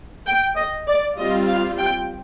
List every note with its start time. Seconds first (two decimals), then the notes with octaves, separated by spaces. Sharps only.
0.27 G5
0.56 D#5
0.87 D5
1.18 G3 C4 F4 D#5
1.48 F5
1.79 G5